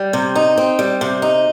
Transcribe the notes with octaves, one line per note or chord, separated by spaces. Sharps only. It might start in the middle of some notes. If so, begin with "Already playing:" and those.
Already playing: G3
C3
D#4
C4
G3
C3
D#4